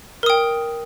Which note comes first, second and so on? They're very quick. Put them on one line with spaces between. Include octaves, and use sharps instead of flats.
A#4 D#6 G5